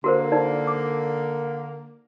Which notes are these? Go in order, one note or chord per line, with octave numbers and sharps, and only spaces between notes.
D3 A#3 F#4 A#4 C5
D#4 D5
D6